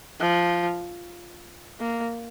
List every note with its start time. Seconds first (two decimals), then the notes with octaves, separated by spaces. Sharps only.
0.20 F3
1.80 A#3